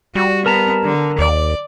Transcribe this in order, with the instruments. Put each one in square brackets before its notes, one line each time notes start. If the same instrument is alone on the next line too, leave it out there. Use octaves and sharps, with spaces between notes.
[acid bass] G3 [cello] F#4
[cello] B3 [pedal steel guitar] A#4 A5 A#5
[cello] D3
[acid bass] D#2 [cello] D5